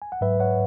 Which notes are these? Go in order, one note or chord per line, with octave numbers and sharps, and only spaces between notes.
G#5
F#5
G#2 F#3 B4 E5
C#5 F#5